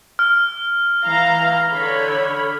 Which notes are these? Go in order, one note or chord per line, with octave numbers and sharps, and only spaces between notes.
F6
E3 F5 A#5
D3 C#5 B5